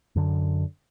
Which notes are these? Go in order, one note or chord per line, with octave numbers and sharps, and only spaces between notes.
F#2 D3